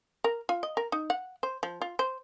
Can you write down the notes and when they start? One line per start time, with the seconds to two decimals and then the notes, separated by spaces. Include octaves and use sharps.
0.24 A#4
0.49 F4
0.63 D#5
0.77 A#4
0.92 D#4
1.10 F#5
1.43 C5
1.63 F3
1.82 F4
1.99 C5